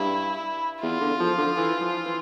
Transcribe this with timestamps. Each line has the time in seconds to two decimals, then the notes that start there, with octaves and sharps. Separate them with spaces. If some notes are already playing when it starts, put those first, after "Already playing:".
Already playing: G2 E4
0.82 E2 F4
1.00 D3
1.20 F3
1.38 D3
1.56 E3
1.81 F3
2.06 E3